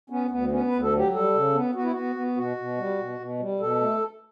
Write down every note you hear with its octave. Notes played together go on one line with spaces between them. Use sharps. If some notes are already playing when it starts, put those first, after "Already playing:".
B3 C#4
D2 B3
B3 C#4
B4
D2
A4
F#3 G4
G3 A4
C#3
B3
B3 F#4
E4
B3 F#4
B3
B2 F#4
B2
G3
B2
B2
G3
B2 A4
A3